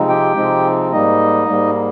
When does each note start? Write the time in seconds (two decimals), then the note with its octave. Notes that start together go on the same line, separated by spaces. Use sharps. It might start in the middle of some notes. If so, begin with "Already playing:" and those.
Already playing: C3 F3 G#3 C4 D#4
0.09 G4 G5
0.36 C3 F3 G#3 C4 D#4
0.92 G#2 G3 A#3 D#4 D#5
1.48 G#2 G3 A#3